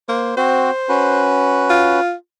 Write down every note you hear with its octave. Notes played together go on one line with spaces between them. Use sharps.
A#3 C5
C4 F#4 C5
C#4 F#4 B4
F4